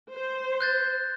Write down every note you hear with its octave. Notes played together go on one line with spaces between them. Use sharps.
C5
F#6 G6 A6